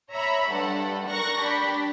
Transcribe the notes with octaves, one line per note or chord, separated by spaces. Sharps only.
C#5 E5 A#5 B5
G2 G3 A4 F#5
A#4 C#6 F#6 A#6
D4 G4 B5